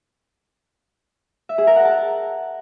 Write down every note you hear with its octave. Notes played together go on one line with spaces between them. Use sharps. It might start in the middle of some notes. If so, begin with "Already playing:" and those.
E5
G#4
A#4
F#5
A5